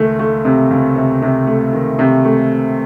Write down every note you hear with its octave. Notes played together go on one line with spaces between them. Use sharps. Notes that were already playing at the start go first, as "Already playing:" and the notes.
Already playing: C#2 D#3 A3
A3
C3
C#2
C3
C3
A3
D#3
C3
A3